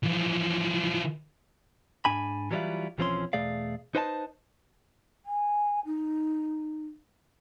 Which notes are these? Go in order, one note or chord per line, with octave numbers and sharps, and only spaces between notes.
E3 F3
G#2 D4 G#5 B5
E3 F#3 G3 D4 E4 F4
B1 E3 F3 C4 C#4 C6
E2 B2 A3 G#4 D5 F5
D#4 B4 C5 D#5 G5 A5
G#5
D#4